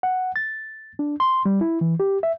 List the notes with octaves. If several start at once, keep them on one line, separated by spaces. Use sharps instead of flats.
F#5
A6
D4
C6
G3
E4
E3
G4
E5